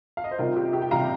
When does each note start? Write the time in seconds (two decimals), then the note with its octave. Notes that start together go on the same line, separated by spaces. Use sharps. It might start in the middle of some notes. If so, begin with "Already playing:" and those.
0.17 F5
0.24 D#5
0.31 C5
0.38 C3 G3 D#4 F4 A#4
0.56 G4
0.73 G4
0.82 G5
0.91 C3 G3 D#4 F5 A#5